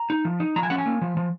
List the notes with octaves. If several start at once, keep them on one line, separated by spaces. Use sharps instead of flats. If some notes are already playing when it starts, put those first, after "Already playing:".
Already playing: A#5
D#4
F3
D#4
F3 A#5
G#5
C#4 F#5
G#5
A#3
F3
F3